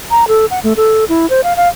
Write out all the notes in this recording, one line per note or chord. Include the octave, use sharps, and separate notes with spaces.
A#5
A4
F#5
A3
A4
E4
C5
F5
F5